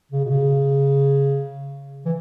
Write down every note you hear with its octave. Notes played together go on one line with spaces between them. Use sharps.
C#3
B2
C#3
E3